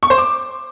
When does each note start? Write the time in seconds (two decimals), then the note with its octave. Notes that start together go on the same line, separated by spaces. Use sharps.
0.03 C#6
0.10 C5
0.18 D6